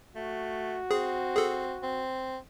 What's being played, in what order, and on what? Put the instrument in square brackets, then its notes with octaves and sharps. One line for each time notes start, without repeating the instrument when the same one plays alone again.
[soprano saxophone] A3 [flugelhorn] F#4
[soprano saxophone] C4 [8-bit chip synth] G#4
[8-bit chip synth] G#4 A4
[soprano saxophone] C4